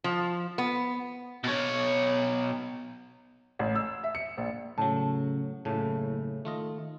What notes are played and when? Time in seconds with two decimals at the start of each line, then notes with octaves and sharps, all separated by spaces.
0.04 F3
0.58 B3
1.44 B2 C#5
3.59 A1
3.75 E6
4.04 E5
4.15 C#7
4.37 A#1
4.78 A2 C#3 F#3 A5
5.65 F#1 A2 C#3 E4 F#4 A4
6.45 D#3 A3 F4 D#5